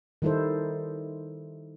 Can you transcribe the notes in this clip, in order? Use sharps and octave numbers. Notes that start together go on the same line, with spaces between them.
D#3 G3 D#4 E4 A4 C5